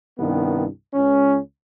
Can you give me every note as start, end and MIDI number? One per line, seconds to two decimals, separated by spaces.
0.19 0.65 36
0.19 0.65 43
0.19 0.65 51
0.19 0.65 59
0.93 1.37 37
0.93 1.37 61